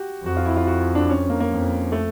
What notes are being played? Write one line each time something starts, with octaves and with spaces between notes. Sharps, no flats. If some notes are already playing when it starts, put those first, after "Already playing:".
Already playing: F#4 G4
F2 F#4
F4
E4
F4
F#4
D4
C#4
A#3
A#3
F2
A3